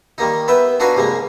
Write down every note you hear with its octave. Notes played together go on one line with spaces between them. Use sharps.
D#3 G3 A#3 D#4
B3 B4 E5 G5
D4 D#4 F#4 B4 F5 G#5
C2 G3 G#3 A#3